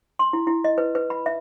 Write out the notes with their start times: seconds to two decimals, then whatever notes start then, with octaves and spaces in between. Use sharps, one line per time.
0.19 C6
0.33 E4
0.47 E4
0.64 D#5
0.78 B4
0.95 B4
1.10 B5
1.26 E5